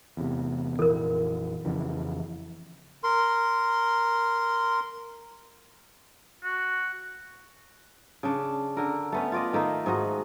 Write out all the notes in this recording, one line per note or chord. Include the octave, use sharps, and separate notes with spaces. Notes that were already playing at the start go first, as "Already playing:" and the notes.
E2 C3
A#1 F2 E3 A4 A#4
F2 C#3 E3
A#4 C6
F#4
C#3 D4
D3 A#4
A3 B3 C#4
F4 D5 D#5
D#3 A3 A#3 D#4
G#2 D#4 F#4 D#5